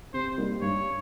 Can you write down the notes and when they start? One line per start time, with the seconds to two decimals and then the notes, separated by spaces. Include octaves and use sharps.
0.13 C3 C5
0.38 G3 A#3 D#4
0.62 G2 C#5